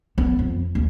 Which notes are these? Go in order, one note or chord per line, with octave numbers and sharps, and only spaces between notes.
B3
F2
D#2